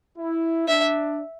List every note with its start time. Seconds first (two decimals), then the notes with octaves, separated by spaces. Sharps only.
0.18 E4
0.68 D4 E5